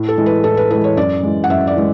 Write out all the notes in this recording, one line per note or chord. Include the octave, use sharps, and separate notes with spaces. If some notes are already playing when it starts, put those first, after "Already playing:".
Already playing: A2
A4
E3 G#3
B4
A2 A4
B4
E3 G#3 B4
C#5
F#2 D5
E3 G#3
F#5
F#2 E5
D5
E3 G#3